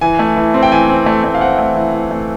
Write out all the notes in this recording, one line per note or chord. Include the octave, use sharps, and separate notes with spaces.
E3 G#5
A3
E3
C4
G5
E3 G#5
C4
A3
A3
F5
C4 F#5
A3
E3
E3
A3